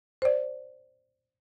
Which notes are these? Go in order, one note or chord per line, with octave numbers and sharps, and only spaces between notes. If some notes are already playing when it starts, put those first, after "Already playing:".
C5 D5